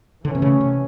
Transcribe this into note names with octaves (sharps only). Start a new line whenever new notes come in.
D3 E3 A3 C#4
C3
C#3
C3